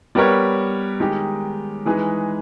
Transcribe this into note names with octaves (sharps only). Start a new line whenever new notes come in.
G3 B3 G4 A#4 C#5
D#3 G#3 D#4 G4
E3 G#3 D#4 G#4 B4